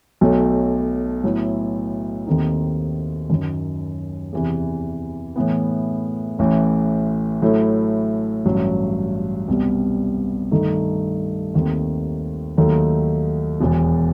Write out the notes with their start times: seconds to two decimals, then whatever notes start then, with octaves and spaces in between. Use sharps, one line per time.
0.21 B1 B2 F#3 A3
1.24 A2 F#3 B3 E4
2.27 D#2 D#3 A3 C4 D#4
3.30 F#2 D#3 F#3
4.33 E2 C3 E3
5.36 A2 E3 B3
6.39 A1 A2 E3
7.42 A2 F#3 A3 E4
8.45 A1 G2 F#3
9.48 C2 B2 G3 B3
10.51 G2 D#3 A3 D#4
11.54 D#2 D#3 A3 C4
12.57 D#2 D#3 F#3 A3 D#4
13.60 E1 E2 B2